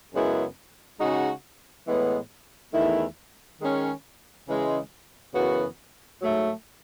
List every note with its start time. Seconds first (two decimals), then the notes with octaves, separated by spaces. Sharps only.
0.13 F#2 C#3 G#3 B3 E4
1.00 C#3 G#3 D#4 F#4
1.87 A2 E3 G#3 B3
2.74 E2 D#3 A3 E4
3.61 D#3 G#3 C#4
4.47 C#3 E3 G#3
5.34 F#2 C#3 E3 B3 F#4
6.21 G#2 F#3 A3